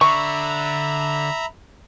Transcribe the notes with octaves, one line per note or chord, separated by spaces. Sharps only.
D3 E5 A#5 B5 C#6